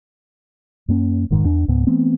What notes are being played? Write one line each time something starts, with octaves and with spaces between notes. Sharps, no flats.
F#2 A#3 C#4
F1 G#2 D#3
E2 D4
C#2 G#2 B3
E3 A3 B3 C4